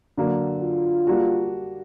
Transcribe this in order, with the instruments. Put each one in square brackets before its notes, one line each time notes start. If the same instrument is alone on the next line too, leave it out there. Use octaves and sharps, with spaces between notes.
[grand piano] D3 F#3 A#3
[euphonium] F4
[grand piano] G3 A#3 D4 F#4